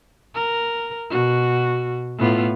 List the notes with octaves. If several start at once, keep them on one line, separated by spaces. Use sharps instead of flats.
A#4
B2 F#4
A2 B3 F4